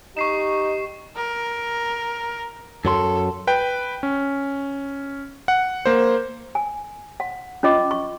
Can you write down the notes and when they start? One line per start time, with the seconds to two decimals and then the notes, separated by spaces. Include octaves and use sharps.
0.17 D#4 G4 C#6 C7 E7
1.17 A#4
2.85 F#2 F#3 A4 C6
3.47 B4 G5
4.03 C#4
5.48 F#5
5.86 A#3 C5
6.55 G#5
7.20 F#5
7.63 C#4 F4 D#5 D6
7.91 C#6